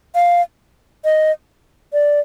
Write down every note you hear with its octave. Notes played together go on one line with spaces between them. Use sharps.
F5
D#5
D5